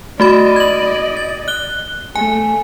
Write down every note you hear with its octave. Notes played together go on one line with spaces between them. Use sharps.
A3 F#4 D5 D#5 B5
G#6 F#7
A6
F#6 G7
A3 G#5